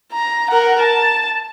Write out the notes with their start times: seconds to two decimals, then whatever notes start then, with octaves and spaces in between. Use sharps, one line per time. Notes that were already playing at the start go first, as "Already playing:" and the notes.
0.12 A#5
0.51 A#4 F#5
0.80 A5